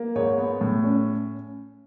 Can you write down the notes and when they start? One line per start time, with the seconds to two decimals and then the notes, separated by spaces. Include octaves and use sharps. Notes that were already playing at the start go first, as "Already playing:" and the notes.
Already playing: A#3
0.15 G#2 C#5
0.38 B3
0.61 A2
0.84 C#4